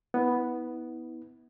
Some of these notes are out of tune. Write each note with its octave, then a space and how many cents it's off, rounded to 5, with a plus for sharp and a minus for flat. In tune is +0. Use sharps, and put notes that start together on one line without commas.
B3 +0 E4 -40